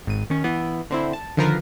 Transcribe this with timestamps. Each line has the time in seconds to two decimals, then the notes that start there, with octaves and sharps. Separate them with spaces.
0.07 G#1 D#7
0.30 D#3 C#4
0.44 E3 B3
0.90 D3 C4 E4
1.13 A5
1.37 D3 D#3 F3 F4 A#4 B4